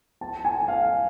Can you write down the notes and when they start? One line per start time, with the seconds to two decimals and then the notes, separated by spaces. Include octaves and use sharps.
0.21 A5
0.45 G#5
0.68 F5